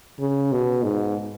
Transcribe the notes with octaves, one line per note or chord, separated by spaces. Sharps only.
C#3
B2
G#2